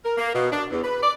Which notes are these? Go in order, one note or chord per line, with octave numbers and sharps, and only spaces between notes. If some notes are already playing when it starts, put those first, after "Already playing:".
A#4
A#3
B2
D4
E2
B4
D5